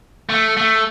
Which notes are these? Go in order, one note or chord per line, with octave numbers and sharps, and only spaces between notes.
A3
A3